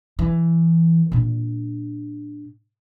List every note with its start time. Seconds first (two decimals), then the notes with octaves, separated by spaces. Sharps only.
0.19 E3
1.12 A#2 D4